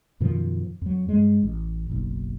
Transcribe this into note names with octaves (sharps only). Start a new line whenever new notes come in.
F#2 B2 D#3 F3
F2 F#3
G2 G#3
A1
F#1 B1